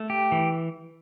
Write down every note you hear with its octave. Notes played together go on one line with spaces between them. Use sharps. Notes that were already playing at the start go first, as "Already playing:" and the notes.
Already playing: A3
G4
E3